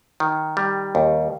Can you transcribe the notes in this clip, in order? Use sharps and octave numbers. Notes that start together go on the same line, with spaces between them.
D#3
G3
D#2